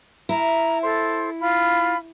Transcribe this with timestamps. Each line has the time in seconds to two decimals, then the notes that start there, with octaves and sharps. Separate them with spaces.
0.29 E4 A#5
0.83 A4 C5
1.40 F4 B5